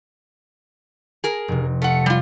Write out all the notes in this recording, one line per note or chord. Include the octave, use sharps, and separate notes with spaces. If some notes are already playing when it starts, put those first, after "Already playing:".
G#4 A#4
F1 C3
A3 F5 F#5
G3 F4 F5